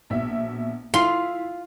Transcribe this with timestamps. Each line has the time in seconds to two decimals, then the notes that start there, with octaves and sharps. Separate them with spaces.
0.10 A#1 B2 E5
0.94 E4 F4 C6 C7 F7